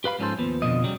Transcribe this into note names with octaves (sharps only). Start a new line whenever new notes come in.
G4 B4 F5 B5
G#2 F3 C#4 F#4 A4 C5
D#2 F3 B3
F2 B2 D3 F3 D#5
C#3 F#3 G3